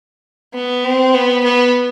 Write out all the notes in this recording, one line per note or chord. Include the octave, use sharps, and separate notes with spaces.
B3
C4
B3
B3